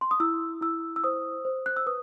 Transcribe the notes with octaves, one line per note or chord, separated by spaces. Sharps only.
C6
D#6
E4 E6
E4 E6
E6
C5 D#6
C5
F#6
E6
B4 D#6